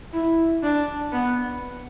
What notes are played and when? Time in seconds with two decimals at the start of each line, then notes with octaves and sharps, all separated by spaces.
0.13 E4
0.63 D4
1.12 B3